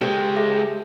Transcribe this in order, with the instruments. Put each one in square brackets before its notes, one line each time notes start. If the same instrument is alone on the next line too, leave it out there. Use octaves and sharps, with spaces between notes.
[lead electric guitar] C#2 G#3 [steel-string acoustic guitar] G4 A4 [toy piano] B4
[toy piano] G#4 E5